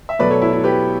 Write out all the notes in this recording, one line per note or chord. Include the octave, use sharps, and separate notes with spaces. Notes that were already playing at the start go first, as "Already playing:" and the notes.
E5
B2 F#3 A3 B4 D5
A4 C#5
E4
E4
G4 B4